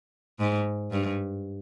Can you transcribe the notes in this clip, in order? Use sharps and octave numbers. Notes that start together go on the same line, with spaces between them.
G#2
G2